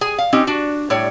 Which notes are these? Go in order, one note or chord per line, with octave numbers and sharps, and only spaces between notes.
G#4 G#5
F5
C4 C#4 D#4 G4
D4 F#4
A2 G3 C#5